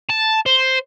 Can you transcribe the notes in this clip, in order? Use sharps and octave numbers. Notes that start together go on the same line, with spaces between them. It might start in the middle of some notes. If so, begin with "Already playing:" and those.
A5
C5